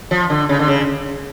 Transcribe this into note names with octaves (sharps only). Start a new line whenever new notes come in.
F3
D3
C#3
D3
C#3